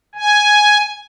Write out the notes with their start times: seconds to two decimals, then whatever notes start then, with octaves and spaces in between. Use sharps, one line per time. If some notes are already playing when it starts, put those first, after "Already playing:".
0.15 G#5